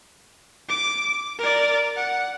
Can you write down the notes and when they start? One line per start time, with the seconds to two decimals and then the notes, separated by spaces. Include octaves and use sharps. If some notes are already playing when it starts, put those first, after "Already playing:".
0.69 D6
1.39 A#4 D5
1.96 F#5